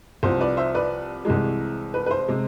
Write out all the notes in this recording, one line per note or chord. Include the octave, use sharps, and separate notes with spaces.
C2 C3 F3 C5
B4 D5
C5 E5
B4 D5
C2 C3 E3 G#3
B4
B4
C5
C3 G#3